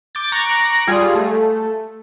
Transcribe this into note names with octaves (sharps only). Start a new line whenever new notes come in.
D6 G6 A6
A#5 C#6 D6 F#6
G3 F4 G#4
A3